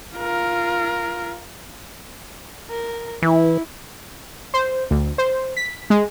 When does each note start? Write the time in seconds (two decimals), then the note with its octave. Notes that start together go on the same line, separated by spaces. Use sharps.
0.16 F4 A#4
2.70 A#4
3.22 E3 E4
4.54 C5
4.91 D2
5.18 C5
5.57 B6
5.90 G#3